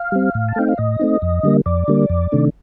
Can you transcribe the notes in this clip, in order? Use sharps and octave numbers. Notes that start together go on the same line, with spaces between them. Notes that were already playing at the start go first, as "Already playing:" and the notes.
Already playing: F5
G3 C4
A2
A5
A3 C4 D#4 G5
F5
A2 D#5
A3 C4 D#4
F2
D3 G3 A#3
F2 D5
D3 G3 A#3
F2
C3 D#3 A3 D4